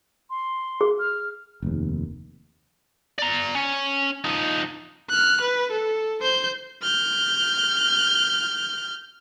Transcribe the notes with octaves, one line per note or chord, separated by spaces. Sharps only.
C6
G#4
F6
F1 D#2
D5 A#5
C#4
F3 D#4
F6 F#6
B4
A4
C5 G6
F6 G6